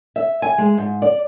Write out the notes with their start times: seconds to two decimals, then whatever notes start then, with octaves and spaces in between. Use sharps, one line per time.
0.16 E5
0.42 G#5
0.58 G#3
0.78 G#2
1.02 D5